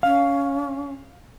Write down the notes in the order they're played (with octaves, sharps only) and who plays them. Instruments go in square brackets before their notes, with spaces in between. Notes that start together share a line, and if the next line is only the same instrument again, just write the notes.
[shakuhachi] C#4 [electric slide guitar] F5